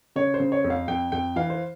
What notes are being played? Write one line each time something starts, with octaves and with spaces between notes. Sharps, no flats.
C#3 C#5
C5
C#3
C#5
F2
F5
F2 G5
F2 G5
E3 F5
C5